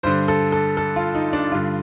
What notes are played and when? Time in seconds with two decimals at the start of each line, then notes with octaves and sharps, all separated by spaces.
0.03 G2 D3 C5
0.28 A4
0.52 A4
0.77 A4
0.96 F4
1.15 D#4
1.33 D4
1.51 G2 D3 F4